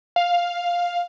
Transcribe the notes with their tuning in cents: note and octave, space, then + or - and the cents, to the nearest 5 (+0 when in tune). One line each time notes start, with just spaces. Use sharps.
F5 +5